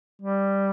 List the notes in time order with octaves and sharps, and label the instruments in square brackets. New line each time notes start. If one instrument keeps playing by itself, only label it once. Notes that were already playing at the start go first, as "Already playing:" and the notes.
[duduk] G3